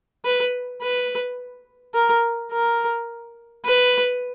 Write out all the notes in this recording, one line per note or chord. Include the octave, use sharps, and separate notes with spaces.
B4
B4
A#4
A#4
B4